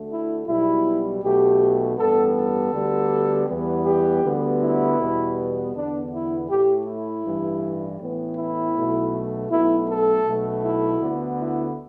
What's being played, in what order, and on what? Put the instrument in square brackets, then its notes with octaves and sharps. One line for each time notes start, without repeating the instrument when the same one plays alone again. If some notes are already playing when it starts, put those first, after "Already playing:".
Already playing: [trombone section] D2 D3 A3
E4
B1 B2 G3 E4
B1 B2 A3 G4
A1 G2 G3 B3 A4
A4
D2 D3 G3 B3
E2 E3 G3 B3
G4
D2 D3 G3 B3
E4
E2 B2 G3 B3
E2 D3 B3 D4
E4
A2 A3 G4
E4
A1 G2 E3 G3
A1 A2 E3 B3
E4
B1 B2 A3
B1 B2 A3 E4
A4
B1 B2 A3
E4
D2 D3 B3
E4